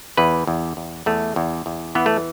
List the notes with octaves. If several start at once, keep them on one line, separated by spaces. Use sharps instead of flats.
E2 B4
E2
E2
E2 A3
E2
E2
E3 B3
A3